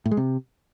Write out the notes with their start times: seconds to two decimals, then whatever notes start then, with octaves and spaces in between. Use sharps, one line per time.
0.06 A2
0.11 G#3
0.17 C3